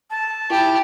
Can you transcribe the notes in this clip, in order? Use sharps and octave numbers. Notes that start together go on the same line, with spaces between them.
A5
E4 G4